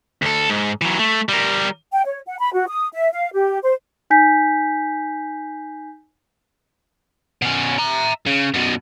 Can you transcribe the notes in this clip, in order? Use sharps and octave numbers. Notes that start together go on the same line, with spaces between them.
D2 A4
G#2
E3 F#3
A3
G3 A#4
G5
C#5
F#5
B5
F#4
D#6
E5
F5
G4
C5
D#4 G#5 G6 B6
B2 C#4
E5 A#5
C#3
F#2 B2